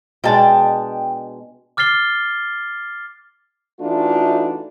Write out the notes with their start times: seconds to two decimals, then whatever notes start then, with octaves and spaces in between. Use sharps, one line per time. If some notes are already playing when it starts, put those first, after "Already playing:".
0.24 B2 G#3 D4 G5 A5
1.77 D6 F6 A6 C7 G7
3.80 E3 A3 D4 D#4 F4 F#4